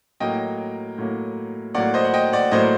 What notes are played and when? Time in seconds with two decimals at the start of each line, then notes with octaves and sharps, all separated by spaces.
0.20 A2 F#3 A#3 D#5 G5
0.98 A2 F#3 A#3
1.75 A2 F#3 A#3 D5 F#5
1.94 C5 D#5
2.05 F#5
2.14 D#5 G5
2.33 D5 F#5
2.51 A2 F#3 A#3 C5 D#5